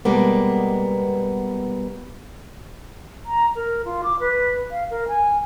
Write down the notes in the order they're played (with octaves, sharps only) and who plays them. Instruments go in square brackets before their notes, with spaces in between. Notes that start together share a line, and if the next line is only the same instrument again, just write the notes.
[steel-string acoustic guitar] B2 G3 G#3 A#3 B3
[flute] A#5
A#4
F4
D6
B4
F5
A#4
G#5